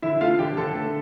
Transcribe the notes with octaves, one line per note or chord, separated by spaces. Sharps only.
D3 E4 E5
A3 F4 F5
D3 G4 G5
D3 A4 A5
A3